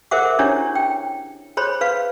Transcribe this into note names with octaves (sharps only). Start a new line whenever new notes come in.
G#4 A#4 C5 E5 F#5 D6
C#4 D4 E4 G4 C#5
G5
G#4 C5 C#5 B5 C6
B4 F5